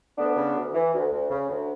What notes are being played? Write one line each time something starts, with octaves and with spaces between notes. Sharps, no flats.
D2 B3 D4
C#3
D2
E3
D2
D2
C#3
D2